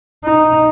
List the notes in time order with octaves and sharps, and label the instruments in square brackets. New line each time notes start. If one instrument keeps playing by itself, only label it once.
[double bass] D#4